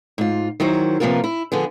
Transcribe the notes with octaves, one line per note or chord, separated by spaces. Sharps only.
G#2 F4
D#3 F#3 E4 C5
C3 F3 A#3 B3 F4 A#4
E4
D3 F3 B3 G#4